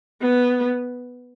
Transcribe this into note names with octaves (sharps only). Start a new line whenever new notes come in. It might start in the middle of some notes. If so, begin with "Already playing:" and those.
B3